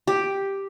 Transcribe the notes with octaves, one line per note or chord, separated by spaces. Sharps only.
G4